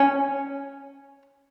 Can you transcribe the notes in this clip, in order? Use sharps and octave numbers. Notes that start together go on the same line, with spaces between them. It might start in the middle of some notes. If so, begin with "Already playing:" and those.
Already playing: C#4